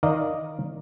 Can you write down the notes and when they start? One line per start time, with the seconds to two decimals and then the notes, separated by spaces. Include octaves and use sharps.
0.03 D#3 D5 D#5 F5 A#5